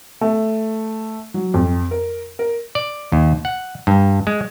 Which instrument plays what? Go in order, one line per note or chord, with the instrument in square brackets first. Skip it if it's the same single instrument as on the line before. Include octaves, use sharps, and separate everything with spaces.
[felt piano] A3
F#3
F2
A#4
A#4
[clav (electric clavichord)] D5
D#2
F#5
G2
G#3